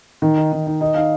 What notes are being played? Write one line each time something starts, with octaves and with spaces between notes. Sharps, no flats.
D#3
D#4
D#3
D#4
D#4 D#5
D#4 F5